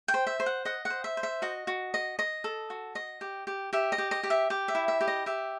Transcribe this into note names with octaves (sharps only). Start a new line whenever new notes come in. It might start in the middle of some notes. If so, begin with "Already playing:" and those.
G5
C5
E5
C5
F#5
D#5 F#5
F#5
C5
E5
C5
E5
F#4 D#5
F#4
D#5
D#5
A4
F#4
D#5
G4
G4
G4 E5
D#5
G4
D#5
G4
E5
G4
E5
E4
E5
G4
D#5
G4 E5